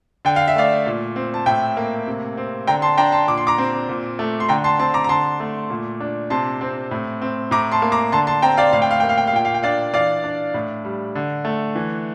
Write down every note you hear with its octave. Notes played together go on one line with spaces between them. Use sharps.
D3 G5
F5
E5
A3 D5 F5
A#2
C4
A5
A2 E5 G5
A#3
C3
C4
D3 G5 A#5
A5 C6
D4 G5 A#5
A5 C6
A#2 D6
C6
A#5 D6
C4
A#2
A3
C6
D3 G5 A#5
A5 C6
C4 A5 C6
A#5 D6
A#5
D3 A5 C6
A3
A#2
D4
C3 A5 C6
C4
A2
C4
A2 A#5 D6
A5 C6
A#3
A#5 D6
D3 A5 C6
A5 C6
C4 G5 A#5
D5 F5
A2 F5
G5
F5
A#3 G5
F5
G5
F5
A#2 G5
F5
G5
D4 D5 F5
E3 D5 F5
D4
A2
G3
D3
A3
E3